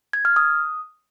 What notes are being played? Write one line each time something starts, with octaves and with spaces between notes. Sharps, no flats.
G#6
F6
D#6